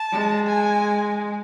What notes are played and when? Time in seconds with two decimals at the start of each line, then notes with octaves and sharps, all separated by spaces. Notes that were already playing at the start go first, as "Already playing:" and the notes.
Already playing: A5
0.12 G#3
0.47 G#5